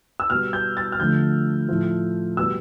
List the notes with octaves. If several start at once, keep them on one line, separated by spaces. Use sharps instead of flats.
E6
B2 G3 F6
G6
A6
F6
D3 F3 A3 G6
A2 F3 A3
B2 G3 E6